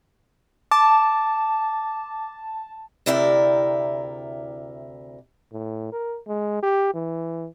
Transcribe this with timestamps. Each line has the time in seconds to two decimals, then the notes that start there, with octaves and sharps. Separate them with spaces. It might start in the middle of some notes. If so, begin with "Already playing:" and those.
0.71 A5 D6
3.06 D2 C3 E4 A#4 D5 G5
5.52 A2
5.93 A#4
6.28 G#3
6.63 G4
6.94 E3